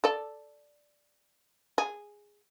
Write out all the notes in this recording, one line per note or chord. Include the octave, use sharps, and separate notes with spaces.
A4 D5
G#4